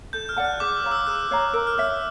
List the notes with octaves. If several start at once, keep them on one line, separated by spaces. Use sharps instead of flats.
A4 G6
F6
D5 F#5 A5
F#6
G#4 D6
E6
C#5 F5 A#5
E6
G#4 F#6
C#5 F5 A#5
A#4 E6
F6
C#5 E5 E6